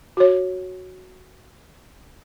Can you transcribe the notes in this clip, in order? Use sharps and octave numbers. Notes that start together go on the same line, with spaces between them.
F#4 C#5